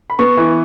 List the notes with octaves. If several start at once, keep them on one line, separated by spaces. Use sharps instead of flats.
B5
B3 C#6
E3